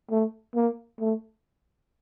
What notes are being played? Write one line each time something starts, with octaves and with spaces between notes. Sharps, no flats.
A3
A#3
A3